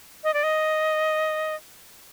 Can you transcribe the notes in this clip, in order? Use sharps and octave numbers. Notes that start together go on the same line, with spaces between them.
D#5
D5
D#5